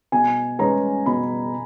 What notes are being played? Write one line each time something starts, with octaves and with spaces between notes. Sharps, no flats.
B2 G#5
G#3 C#4 G#4 B4 A#5
B2 B5